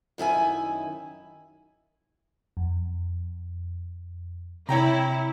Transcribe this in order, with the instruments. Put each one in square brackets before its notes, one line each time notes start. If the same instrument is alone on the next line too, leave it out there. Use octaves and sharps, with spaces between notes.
[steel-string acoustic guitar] F#2 D#3 E4 G#5
[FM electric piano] F2
[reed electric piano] C3 [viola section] E4 [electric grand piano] C#5 G5 A#5